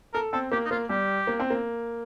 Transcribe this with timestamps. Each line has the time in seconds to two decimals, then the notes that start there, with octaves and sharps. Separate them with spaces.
0.14 A4 A#4
0.33 C4 A4
0.52 A#3 G4
0.65 D#4
0.71 A#3 F4
0.89 G3 G4
1.27 A#3
1.40 C4
1.50 A#3